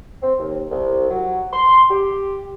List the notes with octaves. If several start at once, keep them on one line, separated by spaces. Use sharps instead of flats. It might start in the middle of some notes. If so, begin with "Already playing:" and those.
C4
D#2
C2
F#3
C6
G4